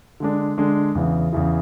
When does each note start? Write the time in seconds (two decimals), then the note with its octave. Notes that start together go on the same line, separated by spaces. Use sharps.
0.20 D3 G#3 D4
0.58 D3 G#3 D4
0.95 E2 C#3 E3
1.33 E2 C#3 E3